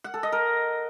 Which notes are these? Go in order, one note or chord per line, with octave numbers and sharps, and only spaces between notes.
F#5
A4
D#5
A#4